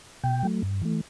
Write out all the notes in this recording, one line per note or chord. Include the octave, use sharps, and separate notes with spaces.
B2 G5
F#3 A3
G2
E3 A3